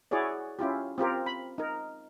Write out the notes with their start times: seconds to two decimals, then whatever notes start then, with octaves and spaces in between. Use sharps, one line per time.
0.11 E4 F#4 G#4 C#5 D5
0.59 C#4 E4 F4 G4
0.98 C4 F4 G4 A#4
1.26 B5
1.58 D#4 A#4